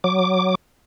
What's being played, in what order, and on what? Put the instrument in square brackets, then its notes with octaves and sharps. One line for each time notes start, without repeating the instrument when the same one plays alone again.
[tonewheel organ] F#3 D6